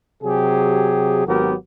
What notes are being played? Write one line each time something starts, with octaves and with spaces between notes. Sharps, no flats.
C3 F#3 G4 G#4
G#1 F#3 B3 G4 A#4